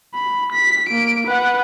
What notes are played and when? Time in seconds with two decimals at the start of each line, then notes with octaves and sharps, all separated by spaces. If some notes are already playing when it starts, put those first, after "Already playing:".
0.14 B5
0.52 B6
0.88 A#3 D7
1.27 B4 F#5